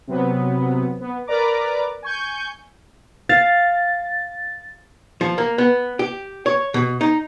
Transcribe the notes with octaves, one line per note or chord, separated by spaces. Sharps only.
C3 F#3 B3
B3
A#4 B4 D5 A#5 D6
G#5 C#6 G6
F5 A6
F3
A#3
B3
G4
C#5
B2
D#4